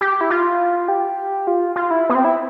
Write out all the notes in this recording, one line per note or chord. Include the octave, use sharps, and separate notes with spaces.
G4
E4
F4
G4
F4
F4
E4
B3
C4
E4